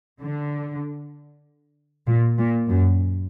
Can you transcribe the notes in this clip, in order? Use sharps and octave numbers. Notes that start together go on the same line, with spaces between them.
D3
A#2
A#2
F#2